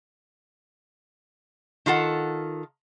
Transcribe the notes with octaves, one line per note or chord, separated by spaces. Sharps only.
D#3 F4 A4 F#5